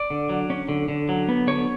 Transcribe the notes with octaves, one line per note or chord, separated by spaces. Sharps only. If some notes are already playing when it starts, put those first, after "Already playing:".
Already playing: D5
D3
F#3
C#4
D3
D3
F#3
B3
D3 C#5